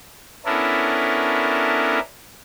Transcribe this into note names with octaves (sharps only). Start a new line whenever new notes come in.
B3 C#4 D4 E4 A4 A#4